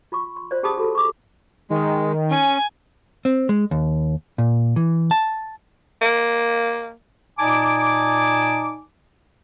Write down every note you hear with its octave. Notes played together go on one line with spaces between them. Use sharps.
F4 B5 C#6
C6
F4 C5 D5
C#4 G4 G#4 A5 B5 D#6
F#4 G4 A4 B5
C#6 D6
D#3 G#3
C#4 G#5
C4
G#3
D#2
A#2
E3
A5
A#3
A#2 D#4 D5 G#5 A5 D6